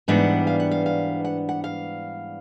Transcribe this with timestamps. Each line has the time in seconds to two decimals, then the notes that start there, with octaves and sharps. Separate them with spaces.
0.08 G#2 E3 G3 B3 D4 F#5
0.47 F5
0.60 F#5
0.71 F5
0.86 F5
1.25 F#5
1.49 F#5
1.64 F5